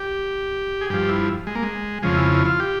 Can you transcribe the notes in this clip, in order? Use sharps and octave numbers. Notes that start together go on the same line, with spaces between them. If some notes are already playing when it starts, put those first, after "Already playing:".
Already playing: G4
G#4
G2 F3 G4
E4
G#3
A#3
G#3
F2 C#3 F3 G#3
E4
E4
F4
G4